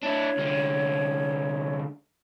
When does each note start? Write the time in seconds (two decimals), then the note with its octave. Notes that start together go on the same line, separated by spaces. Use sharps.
0.03 D4 E4 C#5
0.37 C2 D3